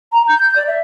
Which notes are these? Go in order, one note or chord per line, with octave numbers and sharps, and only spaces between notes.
A#5
G6
G6
D5
E5